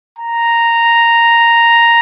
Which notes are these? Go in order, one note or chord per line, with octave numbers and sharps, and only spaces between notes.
A#5